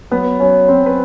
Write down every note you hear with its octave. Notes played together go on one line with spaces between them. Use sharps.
F#3 B3 B4
F#3 C#4 C#5
F#3 C4 C5
B4